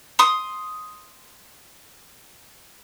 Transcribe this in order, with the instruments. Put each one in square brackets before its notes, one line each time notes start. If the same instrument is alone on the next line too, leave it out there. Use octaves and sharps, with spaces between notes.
[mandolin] C6 D#6